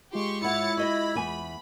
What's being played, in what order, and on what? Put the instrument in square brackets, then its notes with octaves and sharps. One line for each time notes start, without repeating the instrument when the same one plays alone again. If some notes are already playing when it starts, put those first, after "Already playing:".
[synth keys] G#3 F4 [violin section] G4 C6 C#6
[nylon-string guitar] G#2 F#5 [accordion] E4 [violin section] C#5 A6 C#7
[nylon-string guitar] F#4 D#5 E5 [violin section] B5
[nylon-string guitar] E2 G#5